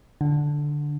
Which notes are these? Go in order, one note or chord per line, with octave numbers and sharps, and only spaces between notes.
D3